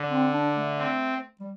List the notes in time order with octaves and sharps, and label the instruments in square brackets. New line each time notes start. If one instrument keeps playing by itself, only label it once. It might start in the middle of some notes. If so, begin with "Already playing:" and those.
Already playing: [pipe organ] D3
[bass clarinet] C4
D4
A3
[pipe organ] C4
[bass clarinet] G3